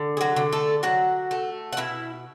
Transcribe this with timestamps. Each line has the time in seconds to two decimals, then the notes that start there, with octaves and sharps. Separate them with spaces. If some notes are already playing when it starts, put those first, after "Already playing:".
Already playing: D3
0.17 G#4
0.21 F#3 F#4
0.36 D3
0.53 A3 A4
0.83 F#3 F#4 F#5
1.31 A3
1.73 F#5
1.77 B2 E4 E5